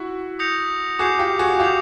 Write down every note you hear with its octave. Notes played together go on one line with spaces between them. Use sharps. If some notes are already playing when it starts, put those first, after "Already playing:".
Already playing: E4 F#4
D#6 G6 A#6 C#7 F7
F#4 G#4 D6 G6 C7 F7
F4 G4
F#4 G#4
F4 G4 D6 G6 C7 F7